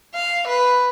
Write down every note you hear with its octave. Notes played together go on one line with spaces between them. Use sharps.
F5
B4